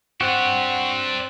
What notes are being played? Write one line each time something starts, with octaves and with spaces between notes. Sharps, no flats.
C4 D4 F#4 G4 F#5 F#6